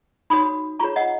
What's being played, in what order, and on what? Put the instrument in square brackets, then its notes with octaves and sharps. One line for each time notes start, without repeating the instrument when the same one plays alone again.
[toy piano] D#4 F#4 C#5 B5 D#6
F4 G#4 C#5 A#5 C#6
D#5 F#5